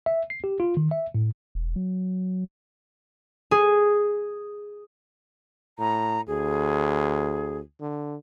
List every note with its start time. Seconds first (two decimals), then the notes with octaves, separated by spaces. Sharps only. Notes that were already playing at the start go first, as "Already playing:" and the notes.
0.06 E5
0.30 C7
0.44 G4
0.60 F4
0.77 D#3
0.91 E5
1.15 A2
1.55 E1
1.76 F#3
3.51 G#4
5.79 A2 A#5
6.28 D2 G#4
7.81 D3